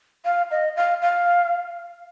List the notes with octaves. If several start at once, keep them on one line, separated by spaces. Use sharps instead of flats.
F5
D#5
F5
F5